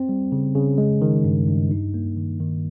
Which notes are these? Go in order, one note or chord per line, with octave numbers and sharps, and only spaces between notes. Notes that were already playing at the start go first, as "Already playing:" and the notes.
Already playing: C4
G3
C#3
C#3
G#3
D#3
G2
G2
D#4
A#3
D#3
D#3